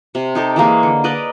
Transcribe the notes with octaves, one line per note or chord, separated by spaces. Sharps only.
C3
D#4 G4 A4
E3 G#3 A#3 G#4
D3
A#4 B4 D5 D#5